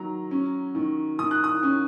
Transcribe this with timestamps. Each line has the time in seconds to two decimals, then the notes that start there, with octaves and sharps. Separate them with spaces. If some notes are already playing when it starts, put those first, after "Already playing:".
Already playing: D#3 F#3 A#5
0.31 C#4
0.75 D#3
1.19 D#3 D#6
1.31 F#6
1.44 D#6
1.63 C#4